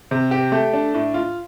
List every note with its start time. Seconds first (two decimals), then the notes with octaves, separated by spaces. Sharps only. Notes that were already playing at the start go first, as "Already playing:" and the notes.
0.11 C3
0.31 G4
0.52 A3
0.73 D4
0.94 A2
1.14 F4